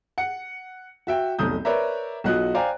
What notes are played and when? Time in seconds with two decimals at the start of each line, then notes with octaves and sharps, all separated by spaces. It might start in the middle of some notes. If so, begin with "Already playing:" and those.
0.18 F#5 C#7
1.07 F#4 E5 G5
1.39 F1 B1 D#6 G6
1.65 A#4 B4 C#5 D5 E5 A#5
2.24 B1 F4 F#4 D#5 F#6
2.55 C5 D5 F5 G5 G#5 A#5